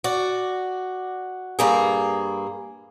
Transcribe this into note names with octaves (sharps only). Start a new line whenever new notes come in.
F#4 D5
G2 A#3 G#4